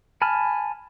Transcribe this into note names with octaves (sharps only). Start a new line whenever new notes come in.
G#5 A5 B5 F6